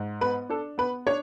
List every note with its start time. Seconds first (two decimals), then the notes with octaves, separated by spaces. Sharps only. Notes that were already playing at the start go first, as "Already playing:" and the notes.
Already playing: G#2
0.21 B3 B4
0.49 D4 A4
0.78 B3 B4
1.07 D4 C#5